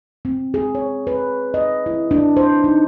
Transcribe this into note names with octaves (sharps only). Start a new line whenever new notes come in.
C4
G#4
C#5
B4
D#5
E4
D4
C5
D#4